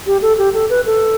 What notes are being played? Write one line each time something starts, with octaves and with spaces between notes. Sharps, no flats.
G4
A4
G4
A4
B4
A4